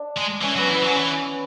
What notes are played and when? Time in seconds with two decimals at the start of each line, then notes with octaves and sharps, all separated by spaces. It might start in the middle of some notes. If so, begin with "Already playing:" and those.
Already playing: D4
0.18 G#3
0.42 E3 C#4
0.56 F#3 B3
0.69 E3
0.75 B3
0.82 F#3
0.90 C#4
0.96 E3